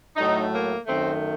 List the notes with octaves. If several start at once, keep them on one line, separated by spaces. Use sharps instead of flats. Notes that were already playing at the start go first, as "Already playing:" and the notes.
A2 F#3 A3 D#4
A#3
F#2 D#3 A3 C4